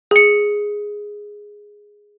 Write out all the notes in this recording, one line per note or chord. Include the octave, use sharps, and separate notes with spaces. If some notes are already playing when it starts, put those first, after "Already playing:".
G#4 C#7